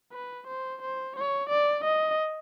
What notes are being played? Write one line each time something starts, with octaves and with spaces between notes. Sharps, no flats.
B4
C5
C5
C#5
D5
D#5